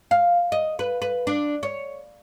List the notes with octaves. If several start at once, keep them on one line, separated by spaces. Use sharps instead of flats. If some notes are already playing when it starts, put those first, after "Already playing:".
F5
D#5
B4
B4
D4
C#5